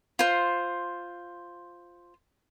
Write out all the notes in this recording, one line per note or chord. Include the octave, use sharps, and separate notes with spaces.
F4 C5